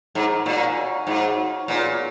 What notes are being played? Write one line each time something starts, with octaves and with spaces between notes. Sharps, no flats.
G#2 D#4 A#4 C#5
A#2 D#4 F#4 C#5 F5
D#4 F#4 C#5 F5
G#2 D#4 F#4 C#5 F5
D#4 F#4 C#5 F5
A#2 B3 F4 G#4 C#5